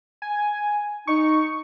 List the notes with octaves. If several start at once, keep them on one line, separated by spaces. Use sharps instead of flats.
G#5
D#4 C#6